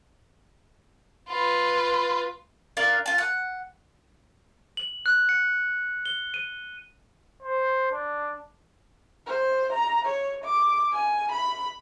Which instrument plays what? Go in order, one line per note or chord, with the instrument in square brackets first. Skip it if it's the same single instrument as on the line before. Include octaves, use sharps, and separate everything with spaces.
[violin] F4 B4
[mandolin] D4 F4 A#4
F4 A5
F#5
[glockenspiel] F#7
F#6
C#7
G7
D#7
[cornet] C5
D4
[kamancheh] C5
A#5
C#5
D6
G#5
B5